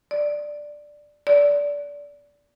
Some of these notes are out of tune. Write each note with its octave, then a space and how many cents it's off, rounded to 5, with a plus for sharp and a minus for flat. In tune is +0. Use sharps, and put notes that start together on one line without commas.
D5 +5
D5 -20